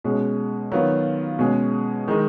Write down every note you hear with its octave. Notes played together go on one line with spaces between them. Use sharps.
B2 G#3 C#4
D#3 F#3 B3 F4
B2 G#3 C#4 G#4
D#3 G#3 D#4